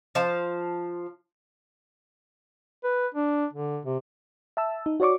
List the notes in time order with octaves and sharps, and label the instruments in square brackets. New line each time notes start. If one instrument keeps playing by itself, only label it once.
[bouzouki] F3 C5 F5 A5
[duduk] B4
D4
D3
C3
[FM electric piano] E5 A5 E6
D#4
F#4 C#5 D5 C#6 D6